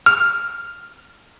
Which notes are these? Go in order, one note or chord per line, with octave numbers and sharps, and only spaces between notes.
F6